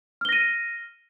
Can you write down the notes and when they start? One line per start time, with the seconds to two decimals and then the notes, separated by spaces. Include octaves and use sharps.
0.21 F6
0.25 G7
0.29 A#6
0.33 D#7